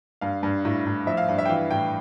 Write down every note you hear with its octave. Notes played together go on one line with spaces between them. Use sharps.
G2 F5
G2
A2
A2
F3 E5
F5
G2
E5
G5
E3 F5
A2 G5